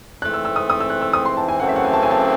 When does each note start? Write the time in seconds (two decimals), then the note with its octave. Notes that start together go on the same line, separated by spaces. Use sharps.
0.22 G#2 E3 A3 C4 F#6
0.34 E6
0.45 E6
0.56 D#6
0.70 D#6
0.80 E6
0.90 F#6
1.02 E6
1.13 D#6
1.25 C6
1.37 A5
1.48 G#5
1.59 F#2 C#3 E3 A3 C4 F#5
1.69 E5
1.76 F#5
1.85 G#5
1.93 A5
2.03 G#5
2.11 A5